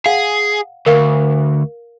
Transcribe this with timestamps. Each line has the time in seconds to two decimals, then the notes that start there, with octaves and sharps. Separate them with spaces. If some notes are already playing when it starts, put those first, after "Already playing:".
0.06 G#4 F5 F#5
0.86 D2 A#4 F5